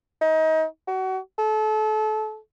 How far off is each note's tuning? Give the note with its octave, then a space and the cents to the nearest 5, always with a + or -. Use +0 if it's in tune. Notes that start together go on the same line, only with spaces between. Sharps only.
D#4 +30
F#4 +30
A4 -30